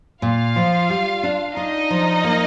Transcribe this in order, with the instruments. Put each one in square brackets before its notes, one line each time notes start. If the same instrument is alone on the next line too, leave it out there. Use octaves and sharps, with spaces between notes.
[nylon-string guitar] A#2 [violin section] F4 F5
[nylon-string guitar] F3
G3
D4
[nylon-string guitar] D4 [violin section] D#4 D#5
[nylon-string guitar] F3
A#3